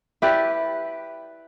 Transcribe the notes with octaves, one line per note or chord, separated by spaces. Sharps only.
E4 G4 B4 D5